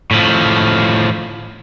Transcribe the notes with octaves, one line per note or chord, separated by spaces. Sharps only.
A2 F3